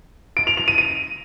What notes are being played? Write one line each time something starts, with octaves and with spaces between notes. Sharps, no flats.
D7
F7
F7
D#7
D#7